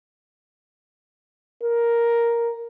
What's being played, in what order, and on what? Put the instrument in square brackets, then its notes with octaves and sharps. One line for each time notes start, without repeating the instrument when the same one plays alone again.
[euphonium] A#4